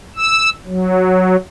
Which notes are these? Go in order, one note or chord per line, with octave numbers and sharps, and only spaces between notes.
E6
F#3